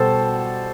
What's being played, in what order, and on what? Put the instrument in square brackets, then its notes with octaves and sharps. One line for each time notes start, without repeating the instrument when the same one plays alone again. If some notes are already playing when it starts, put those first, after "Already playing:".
Already playing: [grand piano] B2 G3 A4 C5 A5